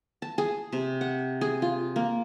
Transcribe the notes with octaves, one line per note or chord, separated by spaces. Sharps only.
A5
G#4
C3
F#5
G#4
F4
A#3